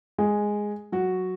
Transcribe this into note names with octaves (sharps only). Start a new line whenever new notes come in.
G#3 G#4
F#3 F#4